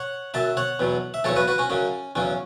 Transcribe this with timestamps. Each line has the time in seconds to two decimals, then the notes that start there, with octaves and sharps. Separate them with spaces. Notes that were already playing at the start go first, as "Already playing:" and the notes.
Already playing: C#5 F#5
0.34 F#2 F#3 E5 A5
0.57 C#5 F#5
0.80 E2 B2 F#3
1.14 E5
1.24 E2 C#3 F#3 A4 C#5
1.36 F#4 B4
1.48 F#4 B4
1.58 C#4 F#4
1.70 F#2 C#3 F#3 C#4
2.16 E2 C#3 F#3 C#4